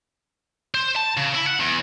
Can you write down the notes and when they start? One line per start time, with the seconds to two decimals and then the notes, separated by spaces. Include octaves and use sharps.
0.74 C5
0.96 A5
1.17 C#3
1.35 E4
1.47 F#5
1.60 E2